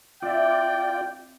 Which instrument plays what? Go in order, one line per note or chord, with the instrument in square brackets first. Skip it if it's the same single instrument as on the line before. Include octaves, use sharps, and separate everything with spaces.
[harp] C4 E5 [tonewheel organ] F4 D5 [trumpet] G5